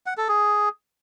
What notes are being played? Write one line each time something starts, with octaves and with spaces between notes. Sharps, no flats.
F#5
A4
G#4